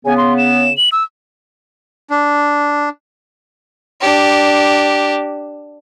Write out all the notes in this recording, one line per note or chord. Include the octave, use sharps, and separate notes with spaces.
C#3 B3 G#5
C6
E7
F#7
E6
D4
D4 G4